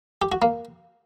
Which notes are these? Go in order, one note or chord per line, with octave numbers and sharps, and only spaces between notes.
G4
F#4
A#3